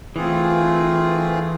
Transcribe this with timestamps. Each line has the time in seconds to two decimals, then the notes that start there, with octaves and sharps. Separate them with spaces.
0.16 E3 A3 C4 F4 G#4